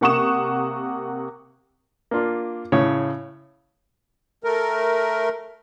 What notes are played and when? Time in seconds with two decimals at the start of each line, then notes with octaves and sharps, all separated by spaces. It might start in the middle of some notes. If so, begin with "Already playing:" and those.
0.01 C3 A#3 F#5 C#6 D#6 E7
2.11 A#3 D4 F4
2.72 A2 C#3 C#5
4.44 A3 A#4